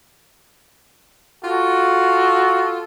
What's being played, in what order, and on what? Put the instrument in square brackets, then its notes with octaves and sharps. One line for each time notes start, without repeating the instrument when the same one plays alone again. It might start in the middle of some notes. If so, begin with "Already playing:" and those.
[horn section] F4 A4 [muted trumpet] F#4